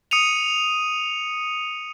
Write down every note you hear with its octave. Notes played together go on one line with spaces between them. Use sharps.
D#6 C#7 D#7 F7